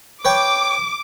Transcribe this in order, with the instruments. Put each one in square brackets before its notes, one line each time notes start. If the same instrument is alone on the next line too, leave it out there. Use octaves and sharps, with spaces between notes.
[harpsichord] B4 C#5 G5 [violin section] D6